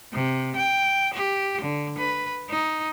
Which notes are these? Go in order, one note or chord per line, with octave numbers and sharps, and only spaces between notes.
C3
G5
G4
D3
B4
D#4